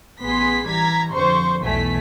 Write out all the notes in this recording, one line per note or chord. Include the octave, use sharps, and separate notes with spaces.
A1 B3 G#4 C6 B6
E3 G3 A#5 G#6 B6
F2 D3 C5 C6 C#6
B1 E2 E3 A3 G#5 B6